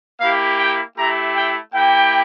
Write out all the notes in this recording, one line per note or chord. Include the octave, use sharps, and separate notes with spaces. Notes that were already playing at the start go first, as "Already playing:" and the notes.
A#3 E4 G4 F5
G5
A3 E4 G4 A#5
G5
A#3 E4 G4 G5